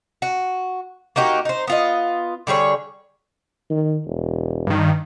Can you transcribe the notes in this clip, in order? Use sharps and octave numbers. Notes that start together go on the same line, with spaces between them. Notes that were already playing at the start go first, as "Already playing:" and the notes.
F#4
A#3 D#4 F#4 G4
D#4 C5
B3 F4 D#5
D3 G3 G#4 C#5
D#3
E1
G2 D#3